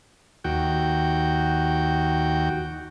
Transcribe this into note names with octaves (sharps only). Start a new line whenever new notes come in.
D#2 F#4 G5